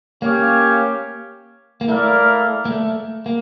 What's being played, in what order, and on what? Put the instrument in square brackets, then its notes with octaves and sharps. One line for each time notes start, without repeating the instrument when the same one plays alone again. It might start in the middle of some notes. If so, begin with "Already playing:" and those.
[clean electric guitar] A#3 [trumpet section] C#4 G4 C#5 F5
[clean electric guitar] A#3
[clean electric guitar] A3 [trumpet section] E4 A#4 D5 F5
[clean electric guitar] A#3
A3
A#3